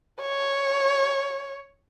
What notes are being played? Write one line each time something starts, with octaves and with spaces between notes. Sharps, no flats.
C#5